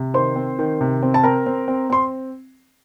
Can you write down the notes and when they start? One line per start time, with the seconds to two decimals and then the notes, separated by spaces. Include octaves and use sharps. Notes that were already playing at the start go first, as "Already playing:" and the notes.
Already playing: C3
0.14 D#3 C5 C6
0.36 C4
0.59 D#3
0.81 C3
1.03 C4
1.14 A5
1.24 C4 A#4 A#5
1.46 C4
1.68 C4
1.90 C4 C6